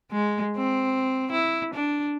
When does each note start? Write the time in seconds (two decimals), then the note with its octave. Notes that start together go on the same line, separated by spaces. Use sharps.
0.11 G#3
0.57 C4
1.32 E4
1.74 D4